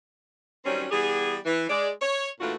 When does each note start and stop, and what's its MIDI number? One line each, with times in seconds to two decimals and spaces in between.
0.65 0.86 51
0.65 0.86 54
0.65 0.86 55
0.65 0.86 60
0.65 0.86 61
0.91 1.35 52
0.91 1.35 55
0.91 1.35 59
0.91 1.35 67
0.91 1.35 68
1.45 1.64 52
1.70 1.89 56
1.70 1.89 74
2.02 2.28 73
2.41 2.53 46
2.41 2.53 52
2.41 2.53 57
2.41 2.53 62
2.41 2.53 65
2.41 2.53 66